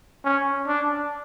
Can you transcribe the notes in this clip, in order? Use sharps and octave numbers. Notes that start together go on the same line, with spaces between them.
C#4
D4